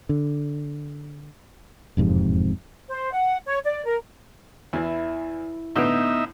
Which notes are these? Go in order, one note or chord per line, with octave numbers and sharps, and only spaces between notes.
D3
E1 F2 G#2 C3
C5
F#5
C#5
D5
A#4
E2 E3 E4
A2 D3 B3 D#4 E5 F6 G6